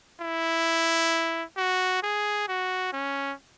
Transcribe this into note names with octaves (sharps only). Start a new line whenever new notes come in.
E4
F#4
G#4
F#4
C#4